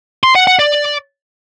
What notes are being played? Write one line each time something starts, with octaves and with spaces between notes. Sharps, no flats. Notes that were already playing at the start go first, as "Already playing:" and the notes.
C6
F#5
F#5
D5